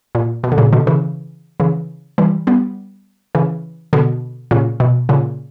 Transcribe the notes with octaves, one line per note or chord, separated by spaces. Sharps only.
A#2
B2
D3
A#2 C#3
B2 D3
C#3 E3
C#3 E3
E3 G3
G3 B3
C#3 E3
B2 D3
A#2 C#3
B2
A#2 C#3